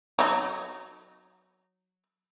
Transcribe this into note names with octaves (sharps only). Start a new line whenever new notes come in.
F#3 D#4